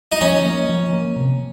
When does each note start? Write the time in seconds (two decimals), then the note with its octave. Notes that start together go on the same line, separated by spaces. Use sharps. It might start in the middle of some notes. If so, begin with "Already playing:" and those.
0.12 D#4
0.21 F3 C#4
0.45 A#3
0.69 F3
0.93 A#3
1.16 C3